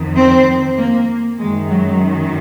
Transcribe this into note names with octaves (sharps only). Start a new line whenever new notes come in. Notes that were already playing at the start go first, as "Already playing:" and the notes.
Already playing: F2 D#3
C4
A#3
F#2 D#3 G#3
F#3